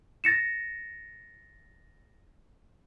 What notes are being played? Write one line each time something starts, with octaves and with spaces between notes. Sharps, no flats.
A6 A#6 C#7 E7